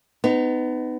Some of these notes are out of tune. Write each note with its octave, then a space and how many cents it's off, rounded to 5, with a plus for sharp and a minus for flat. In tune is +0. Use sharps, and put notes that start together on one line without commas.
B3 +25 D#4 -10